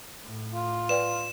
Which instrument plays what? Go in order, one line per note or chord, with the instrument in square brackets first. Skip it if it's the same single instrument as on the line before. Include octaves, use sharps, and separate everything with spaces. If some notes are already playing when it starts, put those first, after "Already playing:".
[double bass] A2
[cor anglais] F4
[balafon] B4 D5 G5 [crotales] E7